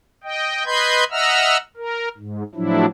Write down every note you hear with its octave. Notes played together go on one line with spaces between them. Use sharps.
D#5 G5
B4 D#5 B5 C6 G6 G#6
D#5 E5 F#5 A#5 E6 F6
A#4
G#2
A2 F3 F#3 D4 E4